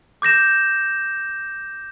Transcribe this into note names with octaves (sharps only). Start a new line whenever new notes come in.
D6 G6 A#6 E7